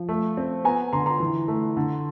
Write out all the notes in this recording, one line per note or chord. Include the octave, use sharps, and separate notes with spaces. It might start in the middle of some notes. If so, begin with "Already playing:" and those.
Already playing: F3
A3
C4
B3 G#5 A#5
D3 A#5 C6
A#5 C6
E3
A3
D3